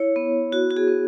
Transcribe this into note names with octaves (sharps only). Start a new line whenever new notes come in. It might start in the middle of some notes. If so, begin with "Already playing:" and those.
Already playing: E4 C#5
B3
F#4
F#4
G#4
B3